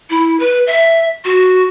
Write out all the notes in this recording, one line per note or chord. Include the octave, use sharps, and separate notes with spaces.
E4
B4
E5
F#4